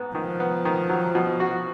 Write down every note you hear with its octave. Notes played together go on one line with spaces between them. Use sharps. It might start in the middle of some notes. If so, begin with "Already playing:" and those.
Already playing: G#2 B3
D#3 F3
B3
D#3
F#3
B2
F#4